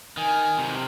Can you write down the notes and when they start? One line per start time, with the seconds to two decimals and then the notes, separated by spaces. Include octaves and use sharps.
0.17 D#3 G#5
0.58 C3